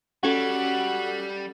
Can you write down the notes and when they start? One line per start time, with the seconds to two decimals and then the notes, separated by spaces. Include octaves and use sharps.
0.24 G3 C#4 F#4 A4